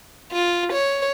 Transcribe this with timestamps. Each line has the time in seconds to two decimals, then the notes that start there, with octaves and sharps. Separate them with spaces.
0.32 F4
0.73 C#5